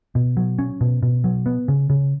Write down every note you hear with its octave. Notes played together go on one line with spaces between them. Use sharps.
B2
F#3
C#4
B2
B2
F#3
B3
C#3
C#3